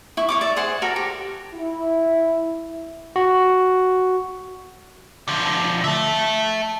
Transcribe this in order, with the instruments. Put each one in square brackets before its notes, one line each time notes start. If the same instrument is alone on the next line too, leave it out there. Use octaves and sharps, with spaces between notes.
[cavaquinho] E4 C#6
C#5 C#6 D6
D5 E5
G#4 C5 F#5
F#4 A4 A#4 C#5
G4
[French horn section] E4
[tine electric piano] F#4
[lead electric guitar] D3 F3
E5 A5